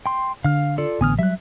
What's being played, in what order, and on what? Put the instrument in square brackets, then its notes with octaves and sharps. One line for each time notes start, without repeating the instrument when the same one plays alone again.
[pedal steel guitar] G5 C6
[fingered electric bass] D3 [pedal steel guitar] F5 F6
[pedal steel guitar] F4 A4 D5
[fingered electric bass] A1 D3 B3 [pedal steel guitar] G#5 D#6 F6
[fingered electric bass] F#3 G3 [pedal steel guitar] E5 F#6